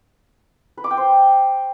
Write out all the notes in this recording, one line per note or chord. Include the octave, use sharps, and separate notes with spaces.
B4
D6
G5
C5